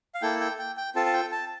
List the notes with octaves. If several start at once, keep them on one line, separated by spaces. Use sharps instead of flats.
F5
A#3 E4 A4 G5
G5
G5
G5
C4 F4 A4 A5
A5
G5
A5